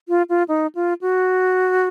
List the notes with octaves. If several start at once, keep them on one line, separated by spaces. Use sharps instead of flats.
F4
F4
D#4
F4
F#4